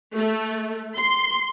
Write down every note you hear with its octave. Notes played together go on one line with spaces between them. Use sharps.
A3
C6